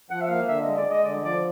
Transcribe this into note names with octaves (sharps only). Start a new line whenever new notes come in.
F3 F#5
E5
A#3 F5
D3 E5
G#3 D#5
D5
G#3 D#5
D3 D5
F3 D5